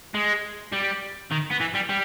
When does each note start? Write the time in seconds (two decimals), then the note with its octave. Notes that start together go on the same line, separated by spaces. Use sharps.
0.14 G#3
0.72 G3
1.31 D#3
1.50 B3
1.60 E3
1.74 G3
1.89 G3